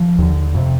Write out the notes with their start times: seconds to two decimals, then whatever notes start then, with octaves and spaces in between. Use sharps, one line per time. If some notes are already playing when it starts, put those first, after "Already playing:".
Already playing: F3
0.18 D#2 D3
0.55 F2 C3